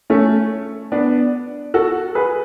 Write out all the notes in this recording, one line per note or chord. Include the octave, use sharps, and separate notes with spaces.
A3 C#4
B3 D4
F#4 A4
G#4 B4